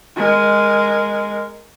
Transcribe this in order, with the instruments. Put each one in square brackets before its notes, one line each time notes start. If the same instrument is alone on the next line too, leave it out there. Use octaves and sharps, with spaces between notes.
[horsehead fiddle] G#3 A#4